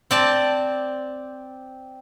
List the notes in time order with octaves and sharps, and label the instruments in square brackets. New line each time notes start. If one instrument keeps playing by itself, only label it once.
[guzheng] C4 D5 A5